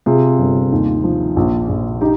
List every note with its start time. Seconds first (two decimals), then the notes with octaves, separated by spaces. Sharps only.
0.06 C3 F4 G#4
0.39 G1
0.72 D#2
1.04 F3
1.36 A#1
1.69 A#1
2.01 D#4 G4